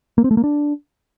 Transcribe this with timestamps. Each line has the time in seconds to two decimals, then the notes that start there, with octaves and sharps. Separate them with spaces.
0.18 A#3
0.24 C4
0.31 A3
0.37 A#3
0.44 D4